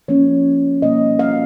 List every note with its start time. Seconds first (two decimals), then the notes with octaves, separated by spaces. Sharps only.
0.08 F3 A#3 C#4 C#5
0.82 B2 G3 A#3 D#5
1.19 F5